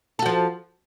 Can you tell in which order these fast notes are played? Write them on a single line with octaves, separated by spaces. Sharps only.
A4 F#4 F3